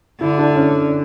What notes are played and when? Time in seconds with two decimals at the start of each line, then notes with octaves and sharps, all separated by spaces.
0.20 D3 E4
0.38 D4
0.56 C#4